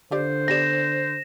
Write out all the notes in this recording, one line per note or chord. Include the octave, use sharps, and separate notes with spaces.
D3 F3 G4 C5 D5
B3 G4 D5 A#6 E7